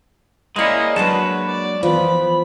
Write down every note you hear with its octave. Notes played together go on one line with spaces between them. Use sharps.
G#3 A#3 C#4 E4 A#4 D5 D#5
F#3 G#3 A#3 D4 F#4 B4 A5
D5
E3 F3 B3 B5